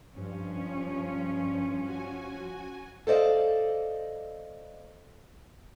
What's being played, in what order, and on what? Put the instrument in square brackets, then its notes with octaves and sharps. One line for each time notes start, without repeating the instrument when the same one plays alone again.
[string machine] G2 [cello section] F3 C#4
[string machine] F#4 G#5
[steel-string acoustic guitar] A4 C5 D5 D#5 F5